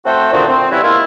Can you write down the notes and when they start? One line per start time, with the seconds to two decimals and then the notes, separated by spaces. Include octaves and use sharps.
0.06 A3 C4 F#4 A4 C5 G5
0.32 A#2 D3 D#3 C4 F4 F#4
0.47 C4
0.71 E3 G3 B3 C#4 E4
0.83 G#3 A#3 E4 F4